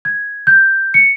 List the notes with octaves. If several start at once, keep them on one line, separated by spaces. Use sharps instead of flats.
G#6
G6
C#7